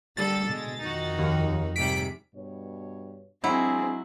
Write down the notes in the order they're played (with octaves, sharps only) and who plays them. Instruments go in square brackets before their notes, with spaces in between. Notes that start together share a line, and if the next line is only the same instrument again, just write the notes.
[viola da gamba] D3 A#3 A4 [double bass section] G3 [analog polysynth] A6
[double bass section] B2 [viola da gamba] G#3
[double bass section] F2 D#3 [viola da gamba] D#4 F#4
[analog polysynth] D#2
[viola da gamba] G#2 C3 G3 [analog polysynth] B6 D7
[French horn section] G2 B2 C#5
[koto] F#3 E4 [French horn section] G#3 D4 [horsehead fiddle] C4 G#4